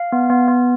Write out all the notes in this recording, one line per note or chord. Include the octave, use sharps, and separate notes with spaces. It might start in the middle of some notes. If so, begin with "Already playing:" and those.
Already playing: F5
B3
B3
B3